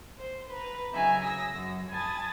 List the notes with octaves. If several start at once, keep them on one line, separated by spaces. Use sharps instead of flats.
C5
B4 A#5
C#3 F#3 D#4 E5 G#5
D#6 E6 A#6
F#2
G#5 A5 B5 D#6 G#6 A6